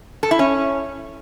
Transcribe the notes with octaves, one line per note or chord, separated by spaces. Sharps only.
A4
E4
C#4